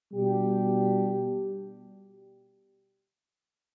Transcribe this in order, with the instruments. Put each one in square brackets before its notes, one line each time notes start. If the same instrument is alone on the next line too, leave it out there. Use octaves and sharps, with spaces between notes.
[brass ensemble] B2 G3 D4 G4